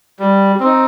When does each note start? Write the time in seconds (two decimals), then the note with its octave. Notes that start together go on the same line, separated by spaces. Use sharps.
0.19 G3
0.60 C4 D#4